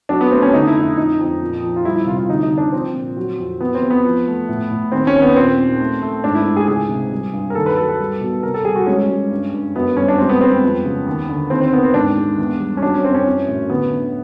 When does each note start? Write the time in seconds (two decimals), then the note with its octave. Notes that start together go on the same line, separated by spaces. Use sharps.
0.09 F#3 D4
0.21 B3
0.31 A3 C4
0.42 C#4
0.53 D3 D#4
0.67 E4
0.76 F2
0.83 E4
0.97 F2 D#4
1.19 F2
1.42 A#2
1.63 F3
1.76 F4
1.85 G3 E4
1.96 E4
2.06 C3 F4
2.17 F4
2.28 D2 D#4
2.43 D#4
2.51 D2
2.58 D4
2.72 F3 C4
2.95 A#2
3.17 F#3
3.39 F2
3.60 E3 B3
3.75 C4
3.82 E2
3.90 B3
4.04 F3
4.27 A3
4.49 A2
4.71 A2
4.92 D#2 C4
5.07 C#4
5.15 D#2
5.22 B3
5.36 A#2 C4
5.58 A#2
5.80 A3
6.02 A3
6.24 G#2 D4
6.35 E4
6.45 G#2
6.56 G#4
6.68 C#2 G#4
6.89 C3
7.12 G3
7.33 G2
7.50 A#4
7.55 D#2 A4
7.66 B4
7.77 F#3 A4
7.89 A4
8.00 G3
8.21 B2
8.43 C2 A#4
8.54 A4
8.65 G3 G#4
8.76 F#4
8.87 G#3 C#4
9.09 G#3
9.31 G2
9.54 G2
9.75 F#2 B3
9.97 G3 C#4
10.08 D4
10.18 G#3 C4
10.29 B3
10.41 G#3 C4
10.51 B3
10.63 F2
10.85 C#3
11.07 D#2
11.29 D3
11.50 D#2 C4
11.61 C4
11.73 D#3 B3
11.84 C4
11.94 G#2 D4
12.17 G#3
12.38 E2
12.60 G3
12.77 C#4
12.82 F#3 D4
12.94 C#4
13.04 F#2 C4
13.15 C#4
13.27 E3
13.48 A2
13.69 D2 B3
13.92 D3